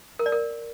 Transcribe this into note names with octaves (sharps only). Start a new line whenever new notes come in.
A#4
D5
A#4